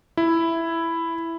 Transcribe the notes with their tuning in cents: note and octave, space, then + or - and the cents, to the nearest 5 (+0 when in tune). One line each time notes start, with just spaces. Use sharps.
E4 +5